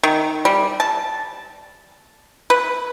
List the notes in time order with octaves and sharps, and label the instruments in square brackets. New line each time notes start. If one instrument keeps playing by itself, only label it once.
[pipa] D#3
G3
A5
B4